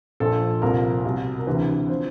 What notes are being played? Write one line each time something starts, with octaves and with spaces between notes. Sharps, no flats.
A#1 A#2 F3 A4
C2 A#2 F3 A#4
C2 B2
A#4
D2 C3 E3 B4
C3 F3 C5